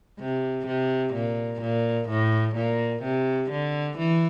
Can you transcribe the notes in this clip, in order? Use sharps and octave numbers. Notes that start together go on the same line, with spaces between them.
C3
C3
A#2
A#2
A2
A#2
C3
D3
E3